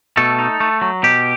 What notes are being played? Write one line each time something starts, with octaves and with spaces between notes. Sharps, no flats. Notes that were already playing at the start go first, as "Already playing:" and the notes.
B2 A3 A4
D#4
A3
F#3
B2 G4